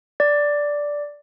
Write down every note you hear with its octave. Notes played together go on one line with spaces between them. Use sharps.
D5